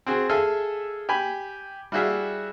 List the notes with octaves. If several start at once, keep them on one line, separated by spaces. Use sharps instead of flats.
C4 F#4 G#4
G#4 A4 E5 F5 G#5
G4 G#5 B5
G3 E4 F#4 G#4 E5 F5